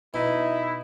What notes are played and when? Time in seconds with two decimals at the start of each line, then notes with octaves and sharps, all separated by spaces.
0.14 B2 D#4 E4